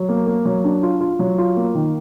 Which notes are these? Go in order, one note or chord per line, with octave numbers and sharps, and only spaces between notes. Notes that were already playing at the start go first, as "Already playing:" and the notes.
Already playing: F#3
A#3
A#3
F#3
D4
F4
F4
F#3
F4
A#3
D#3